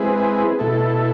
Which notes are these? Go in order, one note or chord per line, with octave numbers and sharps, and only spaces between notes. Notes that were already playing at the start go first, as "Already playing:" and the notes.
Already playing: G#3 C4 E4 G#4 B4
B2 A3 E4 A4